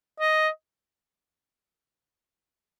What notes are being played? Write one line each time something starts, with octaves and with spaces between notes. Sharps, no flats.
D#5